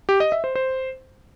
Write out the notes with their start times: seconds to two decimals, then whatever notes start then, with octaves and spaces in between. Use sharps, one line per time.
0.09 G4
0.20 D#5
0.32 E5
0.44 C5
0.55 C5